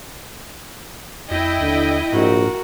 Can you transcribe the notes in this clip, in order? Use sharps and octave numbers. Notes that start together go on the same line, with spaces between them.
F2 E4 D#5 G5
D#2 D3
A#1 G#2 F#4 A#4